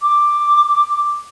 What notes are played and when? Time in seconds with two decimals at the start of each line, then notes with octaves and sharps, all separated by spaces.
0.01 D6